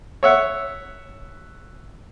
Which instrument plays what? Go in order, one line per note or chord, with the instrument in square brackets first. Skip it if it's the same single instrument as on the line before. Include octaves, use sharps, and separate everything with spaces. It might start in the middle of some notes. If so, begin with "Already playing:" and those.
[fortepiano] C#5 E5 F#5